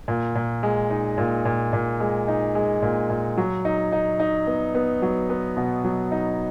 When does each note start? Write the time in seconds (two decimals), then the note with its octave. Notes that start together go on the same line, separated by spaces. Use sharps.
0.08 A#2
0.36 A#2
0.63 G#3
0.90 D#4
1.18 A#2
1.45 A#2
1.73 A#2
2.00 G#3
2.28 D#4
2.55 G#3
2.82 A#2
3.10 A#2
3.37 F#3
3.65 D#4
3.92 D#4
4.20 D#4
4.47 B3
4.75 B3
5.02 F#3
5.30 B3
5.57 B2
5.84 F#3
6.12 D#4